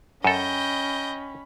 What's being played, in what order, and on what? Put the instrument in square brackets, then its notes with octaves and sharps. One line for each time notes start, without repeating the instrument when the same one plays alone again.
[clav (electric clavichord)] F#2 A4 [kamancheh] C#4 B5 [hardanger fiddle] D#5 G5